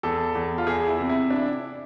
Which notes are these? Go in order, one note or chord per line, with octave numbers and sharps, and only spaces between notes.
E2 A4
E2
F4
E2 G#4
E4
C3
E4
D4